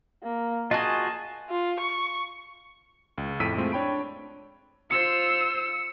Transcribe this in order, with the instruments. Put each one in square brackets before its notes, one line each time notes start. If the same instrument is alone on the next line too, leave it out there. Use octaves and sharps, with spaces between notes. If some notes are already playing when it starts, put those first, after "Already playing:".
[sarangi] A#3
[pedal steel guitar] F4 F#4 G#4 [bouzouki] D#5 G#5 [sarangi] A5
[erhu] F4
C#6
[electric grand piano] C#2
F2 A2 E6 B6 D7 D#7
G#3 A3 C4 F4
D4 C#5 G5 B5 D7
[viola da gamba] F4 C5 [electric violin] E6 [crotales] C#7